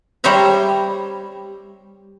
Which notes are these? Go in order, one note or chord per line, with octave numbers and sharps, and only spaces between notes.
G3 C5 C#5 E5 A#5